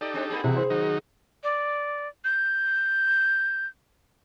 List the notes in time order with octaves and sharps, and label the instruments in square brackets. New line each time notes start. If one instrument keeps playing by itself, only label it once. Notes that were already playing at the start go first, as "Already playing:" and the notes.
[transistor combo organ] D#4 G4 A4 [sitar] D5
[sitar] G#3 C4 D4
A#3 C4 G#4
[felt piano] C3 [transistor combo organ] E3 F#4
[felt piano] C5
[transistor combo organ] D#3 F#3 D#4
[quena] D5
G6